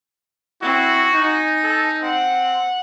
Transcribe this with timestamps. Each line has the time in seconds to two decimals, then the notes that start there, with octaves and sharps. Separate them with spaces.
0.62 C4 E4 F#4
1.13 D#4 G#5
1.64 A4
2.02 C4 F#5